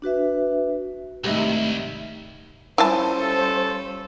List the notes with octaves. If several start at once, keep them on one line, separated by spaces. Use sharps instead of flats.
D4 F#4 B4 E5
C2 G#2 D#3 A3 G4 D#5 E5
G3 C#4 E4 F4 C5 G#5 A5
A4